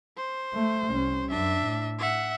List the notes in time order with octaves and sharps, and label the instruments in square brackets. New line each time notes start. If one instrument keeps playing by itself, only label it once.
[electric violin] C5
[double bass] A3
C2 C#4
[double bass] F#2 [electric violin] D4 E5
[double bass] A2
[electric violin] E5 F#5